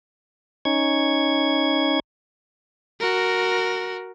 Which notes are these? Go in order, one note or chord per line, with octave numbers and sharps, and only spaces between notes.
C#4 D#4 C#6 G#6
F#4 A#4